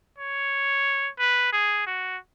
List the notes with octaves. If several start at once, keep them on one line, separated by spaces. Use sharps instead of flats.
C#5
B4
G#4
F#4